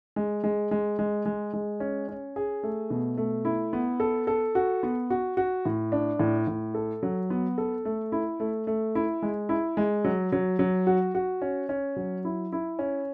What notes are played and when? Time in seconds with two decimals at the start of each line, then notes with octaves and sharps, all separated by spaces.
0.16 G#3
0.44 G#3
0.71 G#3
0.99 G#3
1.26 G#3
1.53 G#3
1.80 C#4
2.08 C#4
2.36 G#4
2.63 A3
2.90 B2
3.17 A3
3.45 E4
3.73 B3
4.00 A4
4.27 A4
4.55 F#4
4.83 B3
5.10 F#4
5.37 F#4
5.65 A2
5.92 D4
6.19 A2
6.47 A2
6.74 A4
7.03 F#3
7.30 B3
7.58 A4
7.85 A3
8.12 E4
8.40 A3
8.67 A3
8.95 E4
9.22 G#3
9.49 E4
9.77 G#3
10.05 F#3
10.32 F#3
10.59 F#3
10.87 F#4
11.15 F#4
11.42 C#4
11.69 C#4
11.96 F#3
12.25 E4
12.52 E4
12.79 C#4